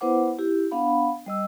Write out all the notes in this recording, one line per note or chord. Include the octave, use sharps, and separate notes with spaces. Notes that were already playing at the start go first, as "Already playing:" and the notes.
B3 E4 B4 C5 F#5 D6
E4 G4
B3 D4 F5 F#5 B5
G3 D#5 E6